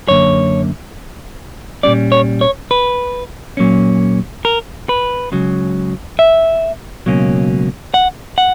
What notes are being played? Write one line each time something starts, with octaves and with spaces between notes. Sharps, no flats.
F#2 D3 A#3 C#5
A#2 G3 C#4 D5
C#5
C#5
B4
A#2 F#3 A#3 C#4
A#4
B4
C#2 C#3 F#3
E5
C#2 B2 F#3 A#3 C#4
F#5
F#5